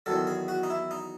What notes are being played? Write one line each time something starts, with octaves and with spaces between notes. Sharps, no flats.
E2 D#3 F#3 A4
G#4
F#4
D#4
E4
D#4